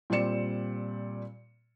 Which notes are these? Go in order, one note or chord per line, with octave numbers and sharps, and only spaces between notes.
A#2 G3 C4 D5 C#7 E7